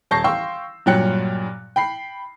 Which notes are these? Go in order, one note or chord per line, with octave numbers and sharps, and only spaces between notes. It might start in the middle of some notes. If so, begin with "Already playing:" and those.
D#1 A5 C#6 G6 A#6 C7
F5 G5 C6 C#6 E6
G2 A#2 F#3 G5 F#6 C#7
G5 B5 C7